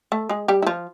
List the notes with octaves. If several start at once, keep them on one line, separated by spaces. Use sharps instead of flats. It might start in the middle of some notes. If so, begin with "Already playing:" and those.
A3 A4
G#3 G#4
G3 G4
E4
F3 F4